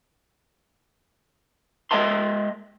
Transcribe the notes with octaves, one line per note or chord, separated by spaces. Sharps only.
G#3 D#5 E5 G5 A5 C6